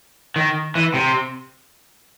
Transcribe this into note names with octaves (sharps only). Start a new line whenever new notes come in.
D#3
E3
C3